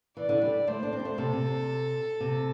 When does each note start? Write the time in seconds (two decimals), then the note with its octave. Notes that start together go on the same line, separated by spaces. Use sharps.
0.16 E3 D5
0.29 D3
0.42 G3
0.67 A3 C5
0.83 D4
0.93 C4
0.99 G3
1.05 A3
1.18 C3 A4
1.33 C3
2.20 C3